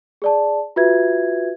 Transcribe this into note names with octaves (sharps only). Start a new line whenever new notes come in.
G#4 D5 A5
F4 F#4 B4 E5 G#6